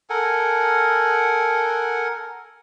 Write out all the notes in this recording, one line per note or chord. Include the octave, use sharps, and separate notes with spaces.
A4 A#4 F#5 G#5